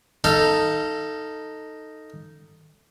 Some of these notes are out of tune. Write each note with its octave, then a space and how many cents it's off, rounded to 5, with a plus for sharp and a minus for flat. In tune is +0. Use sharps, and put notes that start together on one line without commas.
D#4 +0 A4 +10 F5 -20